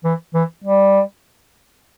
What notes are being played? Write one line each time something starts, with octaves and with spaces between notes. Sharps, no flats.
E3
E3
G3